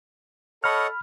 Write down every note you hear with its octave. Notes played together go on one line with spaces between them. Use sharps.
A4 C#5 D#5 F#5 B5 F6